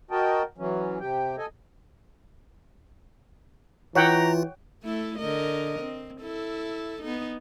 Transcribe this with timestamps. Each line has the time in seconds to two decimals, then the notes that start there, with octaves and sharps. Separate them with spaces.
0.11 F#4 A#4 D#5 G5 A5
0.58 E3 F#3 C#4
1.00 C3 G4 G5
1.38 A4 D#5 G#5
3.95 E3 F4 C#5 F#5 G5 A#5
4.83 A3 E4 A4
5.18 D3 A#4 D#5
5.79 C4
6.22 E4 A4
7.02 B3 D#4